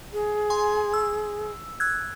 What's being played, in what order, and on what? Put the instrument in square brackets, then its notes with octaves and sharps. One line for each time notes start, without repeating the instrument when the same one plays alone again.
[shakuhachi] G#4
[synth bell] G#5 C6
E6
E6 F#6 G#6